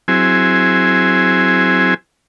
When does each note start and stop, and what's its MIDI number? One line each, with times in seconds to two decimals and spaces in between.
0.08 1.94 54
0.08 1.94 60
0.08 1.94 64
0.08 1.94 68
0.08 1.94 80